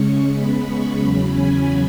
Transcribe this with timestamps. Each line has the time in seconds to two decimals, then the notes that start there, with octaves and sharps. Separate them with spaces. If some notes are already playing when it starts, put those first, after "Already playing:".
Already playing: C#3 G#3 C#4 C#6
0.31 C#3 G#3 B3 B5
0.65 C#6
0.98 E2 C#3 F#3 C#4 B5
1.31 G#5